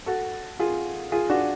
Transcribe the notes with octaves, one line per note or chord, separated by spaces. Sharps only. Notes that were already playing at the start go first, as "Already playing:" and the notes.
F#4 A4
F4 G#4
F4 G#4
D4 F#4